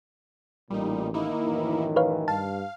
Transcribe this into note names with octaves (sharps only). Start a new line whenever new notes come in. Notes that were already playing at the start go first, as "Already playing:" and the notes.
A1 A#2 G3 D#4
D#3 A#3 D#4 E4
A1 F#2 E3
B4 C#5 F5
G2 F5 A5